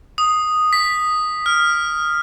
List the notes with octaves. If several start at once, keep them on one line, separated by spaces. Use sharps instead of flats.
D#6
B6
F6